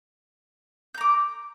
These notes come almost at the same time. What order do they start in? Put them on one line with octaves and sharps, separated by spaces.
G6 A#5 D6